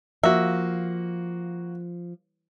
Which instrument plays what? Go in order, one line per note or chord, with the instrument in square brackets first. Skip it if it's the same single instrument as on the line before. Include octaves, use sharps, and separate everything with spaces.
[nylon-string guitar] F3 [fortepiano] A#3 F#4 [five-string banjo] E5